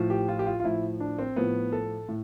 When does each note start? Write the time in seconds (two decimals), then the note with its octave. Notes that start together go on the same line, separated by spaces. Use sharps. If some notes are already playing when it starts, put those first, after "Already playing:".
Already playing: A2 F3
0.10 G4
0.28 F4
0.39 G4
0.46 F4
0.60 F4
0.64 A2 F3 E4
1.00 D4
1.19 C4
1.36 A2 F3 B3
1.73 A4
2.09 A2